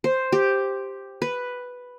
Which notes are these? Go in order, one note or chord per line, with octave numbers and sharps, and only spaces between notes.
C5
G4
B4